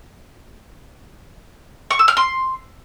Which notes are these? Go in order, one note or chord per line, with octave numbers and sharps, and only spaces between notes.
C#6
E6
F6
C6